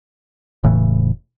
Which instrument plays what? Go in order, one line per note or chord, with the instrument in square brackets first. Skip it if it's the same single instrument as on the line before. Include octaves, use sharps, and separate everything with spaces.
[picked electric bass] E1 A2 C#3 E3